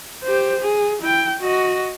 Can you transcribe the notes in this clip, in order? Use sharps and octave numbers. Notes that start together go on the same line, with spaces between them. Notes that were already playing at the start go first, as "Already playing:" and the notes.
G4 C5
G#4
E4 G5
F#4 D#5